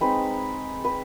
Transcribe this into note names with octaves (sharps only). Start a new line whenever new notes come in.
G#3 C4 D#4 B4
B4